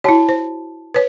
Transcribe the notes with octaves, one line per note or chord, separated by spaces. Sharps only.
E4 F#4 C#5 A5
C5
B4 C#5